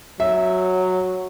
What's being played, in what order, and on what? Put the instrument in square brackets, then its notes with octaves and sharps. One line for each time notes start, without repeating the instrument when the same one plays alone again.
[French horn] F#3 [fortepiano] E5